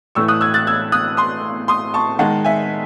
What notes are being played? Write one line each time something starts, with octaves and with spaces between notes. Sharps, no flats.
A2 E3 A3 C#6 E6
D#6 F#6
E6 G#6
F#6 A6
E6 G#6
D#6 F#6
C6 D#6
C6 D#6
A5 C#6
D#3 G#3 F#5 A5
E5 G#5